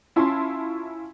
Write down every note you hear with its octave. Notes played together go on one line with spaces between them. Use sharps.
C#4 E4 F4 A5 C6